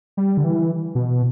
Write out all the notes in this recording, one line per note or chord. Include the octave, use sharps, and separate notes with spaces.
G3
D3
E3
B2